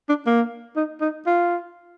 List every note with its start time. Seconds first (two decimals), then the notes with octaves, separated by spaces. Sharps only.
0.09 D4
0.26 A#3
0.76 D#4
1.01 D#4
1.27 F4